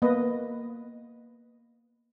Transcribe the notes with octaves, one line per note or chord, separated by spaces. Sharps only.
A#3 B3 A#4 B4 D#5